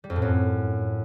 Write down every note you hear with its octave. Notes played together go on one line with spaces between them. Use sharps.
G3
F2
A2
F#2